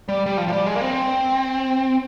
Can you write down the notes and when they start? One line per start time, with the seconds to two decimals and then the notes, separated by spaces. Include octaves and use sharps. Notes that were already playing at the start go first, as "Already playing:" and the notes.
0.09 G3
0.26 G3
0.37 F3
0.48 F3
0.52 G3
0.66 G#3
0.76 A#3
0.81 C4